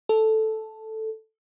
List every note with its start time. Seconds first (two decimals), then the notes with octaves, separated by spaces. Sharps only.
0.09 A4